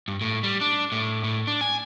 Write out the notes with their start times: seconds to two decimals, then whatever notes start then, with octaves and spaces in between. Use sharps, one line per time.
0.08 G2
0.21 A2
0.43 G3
0.61 D4
0.92 A2
1.24 A2
1.47 D4
1.61 G#5